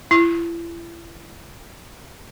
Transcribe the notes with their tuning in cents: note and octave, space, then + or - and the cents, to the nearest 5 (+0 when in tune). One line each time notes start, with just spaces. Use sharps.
E4 +40